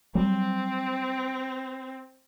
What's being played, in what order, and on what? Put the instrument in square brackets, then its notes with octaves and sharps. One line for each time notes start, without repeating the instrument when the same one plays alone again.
[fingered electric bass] F#3 G3 [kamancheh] C4